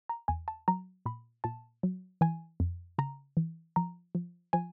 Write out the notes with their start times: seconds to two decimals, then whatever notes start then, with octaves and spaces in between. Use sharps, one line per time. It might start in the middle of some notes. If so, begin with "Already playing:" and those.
0.09 A#5
0.28 E2 G#5
0.48 A5
0.68 F#3 A#5
1.06 A#2 B5
1.44 A#2 A5
1.83 F#3
2.21 E3 G#5
2.60 F2
2.98 C#3 A#5
3.37 E3
3.76 F3 A#5
4.15 F3
4.53 F3 G#5